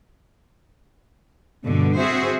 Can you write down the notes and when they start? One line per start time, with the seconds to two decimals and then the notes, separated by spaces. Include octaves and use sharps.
1.64 G2 B2 D3
1.96 C4 F#4 G#4 C5 E5